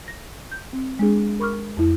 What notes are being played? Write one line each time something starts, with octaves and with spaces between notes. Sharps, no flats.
A#6
G6
C4
G#3 D4 G#4
A#4 B5 C#6 D6 F6
F2 E4